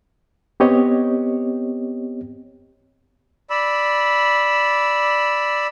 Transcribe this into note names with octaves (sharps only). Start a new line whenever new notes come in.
B3 C4 G4 C#5 D#5
D5 B5 E6